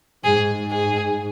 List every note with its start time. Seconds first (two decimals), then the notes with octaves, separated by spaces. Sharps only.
0.24 G#2 G#4
0.71 G#4